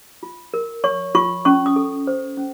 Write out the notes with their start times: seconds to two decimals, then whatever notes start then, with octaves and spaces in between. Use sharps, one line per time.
0.23 F4
0.54 A#4
0.84 C#5 C#6
1.15 F4 C#6
1.45 C#4 C#6
1.66 D#6
1.76 A4
2.07 C5
2.37 C#4